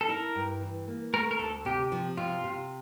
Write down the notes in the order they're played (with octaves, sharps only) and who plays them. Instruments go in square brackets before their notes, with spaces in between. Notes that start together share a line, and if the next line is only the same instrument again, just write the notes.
[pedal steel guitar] A4
[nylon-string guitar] E4 [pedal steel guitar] A#4
[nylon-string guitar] G2
E3
A#3
[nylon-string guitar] A3 [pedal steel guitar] A#4
[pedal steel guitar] A#4
[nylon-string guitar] D2 [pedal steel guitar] A4
[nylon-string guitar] C3 [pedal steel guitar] G4
[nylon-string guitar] F3
[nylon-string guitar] C3 [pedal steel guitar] F4
[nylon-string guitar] C3